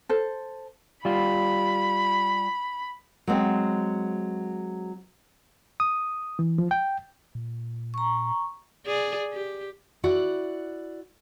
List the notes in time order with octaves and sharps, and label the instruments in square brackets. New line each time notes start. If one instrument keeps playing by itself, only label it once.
[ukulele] A4 C5
[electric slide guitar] G3 F4 [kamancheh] B5
[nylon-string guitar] F#3 G#3 C4
[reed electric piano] D#6
E3
F3
G5
[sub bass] A#2
[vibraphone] A#5 C#6
[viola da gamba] G#4 D5
G4
[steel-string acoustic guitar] E4 F#4 D5 F#5